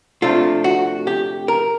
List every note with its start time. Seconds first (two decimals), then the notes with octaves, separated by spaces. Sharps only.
0.22 C3 F3 A3 D4 F4
0.64 F#4
1.07 G4
1.48 A#4